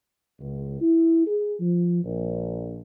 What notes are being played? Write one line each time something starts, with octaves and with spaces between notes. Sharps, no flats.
C#2
E4
G#4
F3
A#1